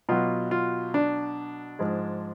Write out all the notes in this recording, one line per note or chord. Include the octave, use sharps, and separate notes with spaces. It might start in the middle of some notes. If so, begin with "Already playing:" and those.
B2 F#3 F4
F4
D4
G#2 F3 G#3